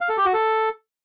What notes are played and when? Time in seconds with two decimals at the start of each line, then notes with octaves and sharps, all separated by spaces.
0.01 F5
0.09 A4
0.17 G4
0.25 F#4
0.34 A4